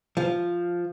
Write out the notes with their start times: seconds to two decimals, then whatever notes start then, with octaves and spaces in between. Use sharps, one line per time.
0.17 F3